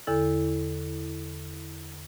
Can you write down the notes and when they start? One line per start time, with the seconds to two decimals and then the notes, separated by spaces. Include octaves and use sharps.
0.07 E2 D3 E4 A4